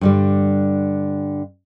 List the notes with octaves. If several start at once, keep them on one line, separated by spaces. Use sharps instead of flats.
G2 D3 G3